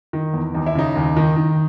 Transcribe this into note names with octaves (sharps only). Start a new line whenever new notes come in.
D#3
E2
D#2 D#4
E4
C#3 D#4
D#2
D#3
D#3